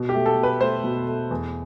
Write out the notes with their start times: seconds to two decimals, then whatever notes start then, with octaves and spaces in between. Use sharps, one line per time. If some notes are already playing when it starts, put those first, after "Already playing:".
Already playing: B2
0.09 G4
0.14 A3
0.26 A4
0.38 B2
0.43 B4
0.60 A3 C5
0.84 B2
1.07 A3
1.31 E2